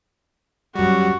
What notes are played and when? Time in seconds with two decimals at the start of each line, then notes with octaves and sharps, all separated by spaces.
0.76 F#2 G3 F#4